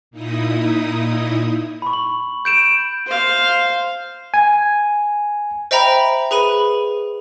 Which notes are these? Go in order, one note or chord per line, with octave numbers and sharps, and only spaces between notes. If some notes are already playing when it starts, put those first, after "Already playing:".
A#2 D#4 E4 D#6
B5 C#6
F#7
G6 D7 E7
C5 F5
G#5
C5 D#5 E5 G5 A#5 B5
G#4 B4 B5 D#7